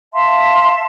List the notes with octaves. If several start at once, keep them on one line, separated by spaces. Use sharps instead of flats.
E5 F5 A5 C6